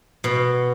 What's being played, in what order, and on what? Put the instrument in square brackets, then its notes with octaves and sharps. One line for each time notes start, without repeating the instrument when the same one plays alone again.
[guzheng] B2